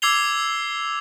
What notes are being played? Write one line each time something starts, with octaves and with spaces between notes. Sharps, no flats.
D6 E6 G#6 C7 F7 G7